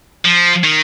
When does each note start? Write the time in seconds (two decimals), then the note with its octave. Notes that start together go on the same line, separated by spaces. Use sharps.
0.25 F3
0.63 D#3